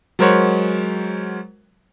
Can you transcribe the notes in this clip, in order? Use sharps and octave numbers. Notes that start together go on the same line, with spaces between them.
F#3 G#3 A#4 C5 C#5 F#5